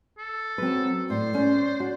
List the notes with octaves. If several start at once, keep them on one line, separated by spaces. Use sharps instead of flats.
A4
F#3 C4 B4
A2 C5 D5
C#4 D5
F#4